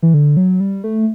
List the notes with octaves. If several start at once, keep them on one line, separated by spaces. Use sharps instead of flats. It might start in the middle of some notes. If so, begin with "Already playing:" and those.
E3
D3
F#3
G3
A3